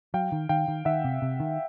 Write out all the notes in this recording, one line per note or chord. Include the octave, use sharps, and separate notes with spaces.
F#3 F5 G5
D#3
D#3 F5 G5
D#3
D#3 E5 F#5
C3
C3
D#3